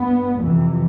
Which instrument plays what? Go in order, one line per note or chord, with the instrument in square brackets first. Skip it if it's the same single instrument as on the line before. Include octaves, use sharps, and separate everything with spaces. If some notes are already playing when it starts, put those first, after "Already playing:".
Already playing: [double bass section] G2 B3
F2 C3 E3